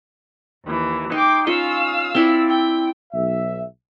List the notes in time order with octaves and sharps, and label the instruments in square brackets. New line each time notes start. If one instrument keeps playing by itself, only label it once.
[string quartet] D#2 E3
[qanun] D#4 [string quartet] G5 C6 D6
[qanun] C#4 F4 D#5 [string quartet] F5 E6
[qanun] C4 E4 D5
[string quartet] G5
[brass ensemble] B1 E5